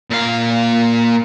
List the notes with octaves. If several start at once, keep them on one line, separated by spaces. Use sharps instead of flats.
A#2 F5